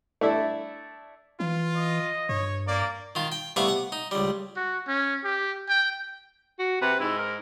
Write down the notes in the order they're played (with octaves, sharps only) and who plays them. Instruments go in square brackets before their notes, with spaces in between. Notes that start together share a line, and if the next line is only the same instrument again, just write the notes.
[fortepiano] A3 D4 E4
[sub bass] E3 [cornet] F4
[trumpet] D#5
[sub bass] G2 [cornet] C#5
[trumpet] A#3 [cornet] D5
[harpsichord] D#3 F4
G5
C2 A3 B3 F5 C#6 D6
F#5
D#4
C#2 G3
[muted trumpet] F#4
C#4
G4
G5
[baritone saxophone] F#4
[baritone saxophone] C3 [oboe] B4
[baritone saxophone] G#2 [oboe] E4
[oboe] A#4